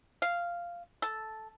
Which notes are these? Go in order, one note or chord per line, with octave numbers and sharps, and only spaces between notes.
F5
A4